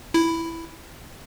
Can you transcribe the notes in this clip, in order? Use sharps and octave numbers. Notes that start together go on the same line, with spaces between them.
E4